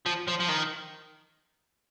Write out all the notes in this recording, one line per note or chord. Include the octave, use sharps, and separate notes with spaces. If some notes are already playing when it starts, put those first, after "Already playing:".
F3
F3
F3
D#3